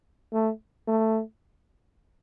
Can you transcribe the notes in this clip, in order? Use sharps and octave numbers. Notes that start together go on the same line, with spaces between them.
A3
A3